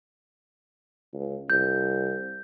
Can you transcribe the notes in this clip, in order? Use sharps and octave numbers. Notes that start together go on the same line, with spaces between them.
C#2
C2 G6